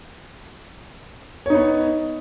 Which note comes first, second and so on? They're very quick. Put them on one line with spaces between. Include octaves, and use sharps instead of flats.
C#5 D#4 B3